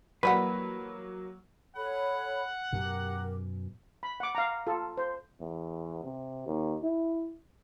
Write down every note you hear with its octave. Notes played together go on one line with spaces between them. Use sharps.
E3 F#3 G3 A#3 B4 F#5
A4 C#5 F#5 B5
F#2 B2 G4 A#4
B5
F#5 D6
F5 A#5
F4 A4
C5
E2
C3
D#2
E4